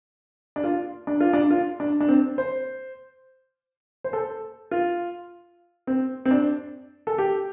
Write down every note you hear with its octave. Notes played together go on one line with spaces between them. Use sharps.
D4
F4
D4
F4
D4
F4
D4
D4
C4
C5
C5
A4
F4
C4
C4
D4
A4
G4